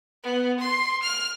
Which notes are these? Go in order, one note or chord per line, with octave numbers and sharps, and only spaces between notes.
B3
C6
F6